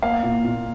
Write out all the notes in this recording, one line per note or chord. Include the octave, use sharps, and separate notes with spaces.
A#3 F5
A#2
A#2